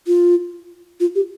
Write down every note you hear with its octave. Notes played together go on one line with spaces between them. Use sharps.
F4
F4
G4